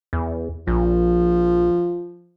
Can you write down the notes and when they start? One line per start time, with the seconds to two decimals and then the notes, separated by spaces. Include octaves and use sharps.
0.13 E2
0.67 A#1 F3